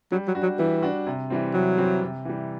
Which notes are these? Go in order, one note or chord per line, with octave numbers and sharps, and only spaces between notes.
F#3 G3
F#3
D4 F#4
F#3
E3 G3
D4 F#4
C3
E3 G3 C4
C3 F#3
E3 G3 C4
C3
E3 G3